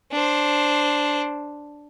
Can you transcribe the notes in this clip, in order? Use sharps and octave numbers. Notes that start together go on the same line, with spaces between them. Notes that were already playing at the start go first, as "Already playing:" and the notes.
D4 C5